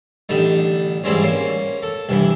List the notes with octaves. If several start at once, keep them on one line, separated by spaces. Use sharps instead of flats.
A1 D3 G3 D#4
G#2 E3 G3 C4 C#4
A#3 C#4
A4
C2 G2 E3